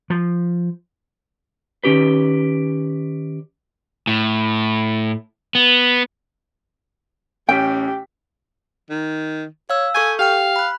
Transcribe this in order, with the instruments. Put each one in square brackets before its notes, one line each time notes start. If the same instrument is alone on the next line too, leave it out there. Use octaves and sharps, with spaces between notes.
[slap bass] F3
[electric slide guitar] D#3 C#4 G4 B4
[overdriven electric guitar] A2
B3
[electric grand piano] A1 C#4 B6 [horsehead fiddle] G4 [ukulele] G5
[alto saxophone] D#3
[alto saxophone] C#5 [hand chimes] F5 E6
[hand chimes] A4 C#6 G6 [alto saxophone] G#5
[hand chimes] G4 G5 F6 [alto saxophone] F5
[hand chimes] B5 F#6